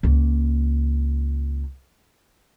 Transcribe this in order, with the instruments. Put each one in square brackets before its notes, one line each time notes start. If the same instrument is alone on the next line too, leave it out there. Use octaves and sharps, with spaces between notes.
[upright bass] C#2 A#3